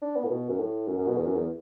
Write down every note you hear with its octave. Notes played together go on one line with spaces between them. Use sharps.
D4
B3
A2
B2
F#2
A2
F#2
F#2
B2
E2
F#2
E2